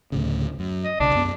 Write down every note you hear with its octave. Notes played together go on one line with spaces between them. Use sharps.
D2 A2 C#3
F#2
D#5
B1 C#3 D4
F#2 B3